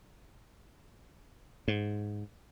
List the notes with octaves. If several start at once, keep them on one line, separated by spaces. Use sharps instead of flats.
G#2